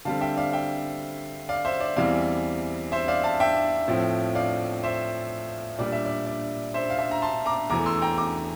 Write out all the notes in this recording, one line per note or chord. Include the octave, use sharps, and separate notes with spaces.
D3 G3 C4 F5 A5
E5 G5
D5 F5
E5 G5
D5 F5
C5 E5
D5
E2 E3 G3 C4 D5 F5
C5 E5
D5 F5
F5 A5
E5 G5
A2 F3 C4
D5 F5
C5 E5
A#2 G3 D4 D5
E5
D5
D5
C5 E5
F5
C5 E5
A#5
A5 C6
A#5 D6
E2 E3 A3 A#5 D6
C6 E6
G5 A#5
A#5 D6